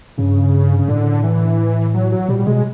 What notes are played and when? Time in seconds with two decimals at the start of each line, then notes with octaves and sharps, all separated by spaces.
0.18 G2 C#3
0.79 C#3
0.88 A2 D3
1.24 E3
1.94 F#3
2.12 F#3
2.29 A#2 G3
2.39 G3
2.47 B2 G#3